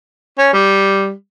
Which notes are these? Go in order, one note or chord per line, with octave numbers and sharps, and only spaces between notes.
C#4
G3